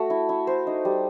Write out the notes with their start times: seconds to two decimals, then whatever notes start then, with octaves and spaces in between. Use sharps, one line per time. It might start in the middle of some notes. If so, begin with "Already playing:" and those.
Already playing: A3 F#4
0.10 E4
0.29 E4
0.47 C5
0.67 D#4
0.85 G3